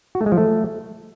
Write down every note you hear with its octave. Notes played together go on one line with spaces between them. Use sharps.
F#4
A3
G#3
F3
A3